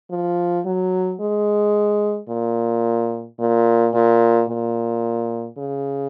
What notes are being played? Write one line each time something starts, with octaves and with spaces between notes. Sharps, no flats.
F3
F#3
G#3
A#2
A#2
A#2
A#2
C#3